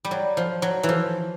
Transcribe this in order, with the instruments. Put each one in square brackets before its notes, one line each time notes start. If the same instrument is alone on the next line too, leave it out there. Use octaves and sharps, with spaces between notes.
[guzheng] G3
F#3
F3
F#3
E3
F3